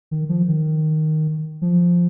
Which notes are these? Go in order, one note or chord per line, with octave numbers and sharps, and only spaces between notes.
D#3
F3
D#3
F3